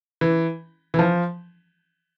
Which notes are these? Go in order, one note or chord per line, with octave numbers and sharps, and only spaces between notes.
E3
E3
F3